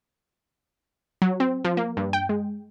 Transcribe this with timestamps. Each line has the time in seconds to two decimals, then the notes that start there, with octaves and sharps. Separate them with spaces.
1.22 F#3
1.40 C4
1.65 F3
1.77 A#3
1.97 G2
2.13 G5
2.29 G#3